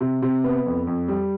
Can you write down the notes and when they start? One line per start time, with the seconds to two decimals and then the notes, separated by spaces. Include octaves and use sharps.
0.01 C3
0.22 C3
0.44 B3
0.66 F2
0.87 F2
1.08 G3